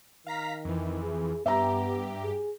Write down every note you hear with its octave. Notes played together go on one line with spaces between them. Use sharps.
D#3 F5 A#5 B6
F2 E3
G#4
G2 B3 G4 E5 A#5
G#4